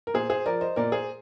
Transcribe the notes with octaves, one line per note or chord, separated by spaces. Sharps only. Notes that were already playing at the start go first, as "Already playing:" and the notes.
A#4
A#2 G#4 C5
G#4 C5
F3 A#4 D5
C5 D#5
A#2 A#4 D5
G#4 C5